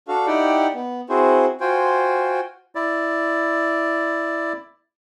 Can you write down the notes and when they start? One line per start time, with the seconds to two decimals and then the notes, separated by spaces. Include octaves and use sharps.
0.08 D4 F#4 A4 F5
0.27 D#4 E4 G4 D5 F#5 G5
0.74 B3
1.09 C4 E4 F#4 G#4 C5
1.61 F4 F#4 C5 G5 G#5
2.75 E4 D5